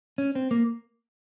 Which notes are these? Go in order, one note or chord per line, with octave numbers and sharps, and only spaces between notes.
C#4
C4
A#3